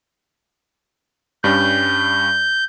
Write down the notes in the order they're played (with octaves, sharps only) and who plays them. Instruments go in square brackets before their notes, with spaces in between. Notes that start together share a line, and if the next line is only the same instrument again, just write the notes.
[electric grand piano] G2 G3 C#4 [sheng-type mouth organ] G6